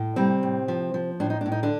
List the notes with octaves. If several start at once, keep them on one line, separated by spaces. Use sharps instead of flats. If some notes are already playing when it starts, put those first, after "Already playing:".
Already playing: A2
C3 G3 C4
A2
F3
F3
A2 D4
D#4
A2 D4
D#4
D3 D4